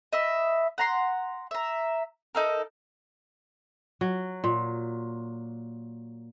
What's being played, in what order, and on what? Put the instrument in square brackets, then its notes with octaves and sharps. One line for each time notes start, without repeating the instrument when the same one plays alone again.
[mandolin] D#5 E5 B5
F#5 A#5 C6
E5 A#5
D#4 A4 A#4
[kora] F#3
A#2